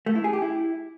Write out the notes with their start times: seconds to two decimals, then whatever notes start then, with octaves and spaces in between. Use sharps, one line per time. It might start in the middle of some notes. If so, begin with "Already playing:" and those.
0.06 A3
0.15 E4
0.24 G#4
0.33 G4
0.42 E4